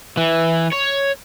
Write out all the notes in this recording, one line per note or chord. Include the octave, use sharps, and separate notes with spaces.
E3
C#5